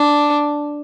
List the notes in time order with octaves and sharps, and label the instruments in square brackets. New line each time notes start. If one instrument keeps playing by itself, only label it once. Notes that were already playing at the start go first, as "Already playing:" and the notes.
Already playing: [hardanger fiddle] D4